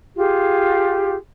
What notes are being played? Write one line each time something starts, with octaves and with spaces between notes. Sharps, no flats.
F4 G4 G#4